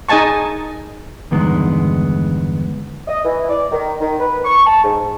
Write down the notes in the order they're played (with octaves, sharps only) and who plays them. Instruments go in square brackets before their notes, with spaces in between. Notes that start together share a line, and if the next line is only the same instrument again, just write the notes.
[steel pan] D#4 G#4 D#5 G#5 A5 C#6
[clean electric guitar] E2 G2 D3 D#3 G#3 B3
[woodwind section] D#5
E3
D5
D#3
D#3
B4
C#6
A5
G#2